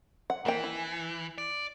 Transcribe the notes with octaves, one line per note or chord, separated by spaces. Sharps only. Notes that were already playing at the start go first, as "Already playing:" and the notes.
F#5
E3 A#3 E4 G5
E4
D5